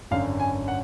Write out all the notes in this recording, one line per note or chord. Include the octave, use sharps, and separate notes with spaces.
G#1 F#2 D3 F5
G#5
F#5